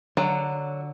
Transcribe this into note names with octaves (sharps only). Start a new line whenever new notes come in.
D3 F#3